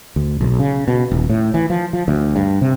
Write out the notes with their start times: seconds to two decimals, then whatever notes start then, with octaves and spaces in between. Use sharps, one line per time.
0.16 D2
0.41 B1
0.59 C#3
0.88 B2
1.11 D#1
1.29 A2
1.54 E3
1.70 F3
1.93 F3
2.08 D2
2.36 G2
2.61 C3